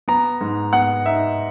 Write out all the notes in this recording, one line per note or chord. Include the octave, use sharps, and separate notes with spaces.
B3 A#5
G#2
B3 F#5
D#4 E5